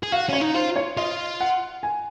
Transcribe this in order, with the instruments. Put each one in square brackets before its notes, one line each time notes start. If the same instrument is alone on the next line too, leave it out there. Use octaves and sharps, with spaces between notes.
[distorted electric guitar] G#4
[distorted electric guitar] F#4 [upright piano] F5
[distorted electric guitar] C#4 [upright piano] C#5
[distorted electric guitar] D#4
[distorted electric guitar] F4 [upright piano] C5
[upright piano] C#5
[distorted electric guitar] F4 [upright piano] D#5
[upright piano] F#5
G#5